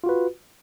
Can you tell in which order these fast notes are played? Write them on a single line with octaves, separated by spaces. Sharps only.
F4 F#4 B4